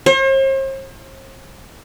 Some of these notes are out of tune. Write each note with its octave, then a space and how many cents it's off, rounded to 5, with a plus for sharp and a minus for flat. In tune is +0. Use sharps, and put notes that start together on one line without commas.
C5 +45